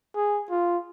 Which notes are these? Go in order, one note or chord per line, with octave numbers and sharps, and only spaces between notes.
G#4
F4